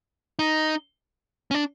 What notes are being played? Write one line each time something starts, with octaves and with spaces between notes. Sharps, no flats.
D#4
C#4
D4